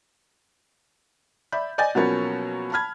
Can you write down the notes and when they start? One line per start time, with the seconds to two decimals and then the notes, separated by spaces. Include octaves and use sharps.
1.52 D5 E5 B5 G6
1.78 D5 D#5 G#5 G6 A6
1.95 B2 F3 F#3 A#3 B3 C#4
2.72 A5 B5 F6 G#6